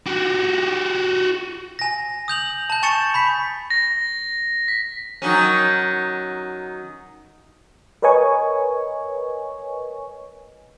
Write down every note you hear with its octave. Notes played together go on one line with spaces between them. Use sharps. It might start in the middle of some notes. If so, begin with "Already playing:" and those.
F#4 G4
G#5 A#6
D#6 G6 F7 F#7
A5 G6
G#5 C#6 A6 C#7 E7
B5 G6 B6
A#6
B6
D#3 F#3 C#4
A#4 B4 C#5 D#5 G#5 C#6